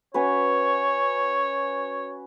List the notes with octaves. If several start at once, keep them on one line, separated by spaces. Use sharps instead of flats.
C#4 F#4 B4 C#5